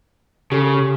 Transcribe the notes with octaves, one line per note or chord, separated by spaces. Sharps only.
C#3 G4 A4